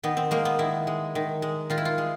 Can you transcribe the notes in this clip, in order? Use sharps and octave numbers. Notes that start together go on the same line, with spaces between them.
D#3 B3
C4
G#3 A#3
B3
D#3 E4
G#3
D#3
G#3
D#3 F4
E4
F4
G#3